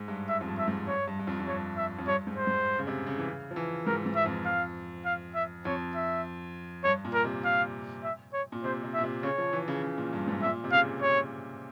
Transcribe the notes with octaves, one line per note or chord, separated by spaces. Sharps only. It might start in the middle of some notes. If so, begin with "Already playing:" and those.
Already playing: G#2
G2
E5
F2
G2
E5
G#2
G2 C#5
G2
G2
F2
F2
G2 C#5
E5
F2
G2 C#5
G#2
C5
G#2
C#3
C3
C#3
E3
C#3
F3
E3
G#2 A#4
G#2
E5
F2
F5
F5
E5
F2 C#5
E5
G2 C#5
A#2
A#4
C3
F5
E5
C#5
A#2
C3 C5
C3
E5
A#2
C3
C#3 C#5
F3
E3
C#3
C#3
A#2
G2
G#2
A#2 E5
C3
C#3 F5
C#5